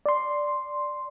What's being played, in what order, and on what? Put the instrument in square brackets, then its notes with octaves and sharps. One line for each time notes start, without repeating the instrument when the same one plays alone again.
[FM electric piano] D5 C6